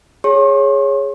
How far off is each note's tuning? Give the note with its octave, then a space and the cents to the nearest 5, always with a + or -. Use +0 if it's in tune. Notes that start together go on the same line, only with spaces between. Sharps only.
G#4 +0 C#5 -5 C6 +45